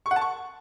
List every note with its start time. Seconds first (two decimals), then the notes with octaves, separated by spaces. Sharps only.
0.06 C#6
0.11 F#5
0.16 A5
0.21 C#6